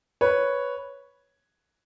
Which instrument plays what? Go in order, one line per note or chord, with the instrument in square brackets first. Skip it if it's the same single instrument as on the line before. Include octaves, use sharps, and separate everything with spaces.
[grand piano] B4 C#5